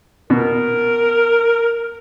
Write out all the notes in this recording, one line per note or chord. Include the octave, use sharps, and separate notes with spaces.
B2 A#4